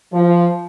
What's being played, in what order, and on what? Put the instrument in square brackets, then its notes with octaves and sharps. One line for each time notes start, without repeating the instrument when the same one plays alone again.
[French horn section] F3